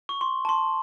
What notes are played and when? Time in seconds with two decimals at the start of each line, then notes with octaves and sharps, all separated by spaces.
0.09 C#6
0.21 C6
0.45 A5
0.49 C6